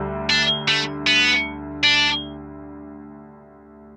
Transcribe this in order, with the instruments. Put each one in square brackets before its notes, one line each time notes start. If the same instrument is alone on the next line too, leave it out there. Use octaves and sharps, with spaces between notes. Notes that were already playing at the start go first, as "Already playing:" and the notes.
Already playing: [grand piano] D2 D3 G3
[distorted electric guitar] D4
A3
B3
D4